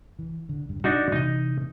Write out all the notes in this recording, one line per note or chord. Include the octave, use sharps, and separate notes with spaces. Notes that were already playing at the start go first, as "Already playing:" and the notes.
E3
D3
G2
G3 D4 D#4 F#4
C3 E3 D#4 D#5